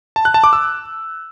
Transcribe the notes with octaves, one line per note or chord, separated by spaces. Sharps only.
A5
F#6
A5
D6
E6